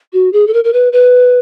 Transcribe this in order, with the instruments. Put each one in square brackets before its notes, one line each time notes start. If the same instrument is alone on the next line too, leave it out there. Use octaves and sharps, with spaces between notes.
[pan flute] F#4
G#4
A4
A#4
A#4
B4
B4